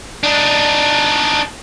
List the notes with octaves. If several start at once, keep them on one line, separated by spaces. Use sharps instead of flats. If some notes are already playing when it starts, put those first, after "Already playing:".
D4 D#4